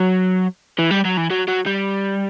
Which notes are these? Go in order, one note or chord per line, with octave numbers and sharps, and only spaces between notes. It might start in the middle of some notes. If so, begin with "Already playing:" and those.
Already playing: F#3
E3
G3
F#3
E3
F#3
F#3
G3